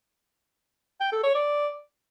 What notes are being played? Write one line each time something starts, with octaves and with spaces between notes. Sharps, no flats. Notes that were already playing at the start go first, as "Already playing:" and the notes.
G5
A4
C#5
D5